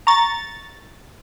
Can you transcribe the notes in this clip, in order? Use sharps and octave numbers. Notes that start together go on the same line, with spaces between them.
A#5 C#6 A6